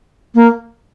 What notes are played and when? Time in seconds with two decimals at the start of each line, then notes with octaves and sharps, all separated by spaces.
0.35 A#3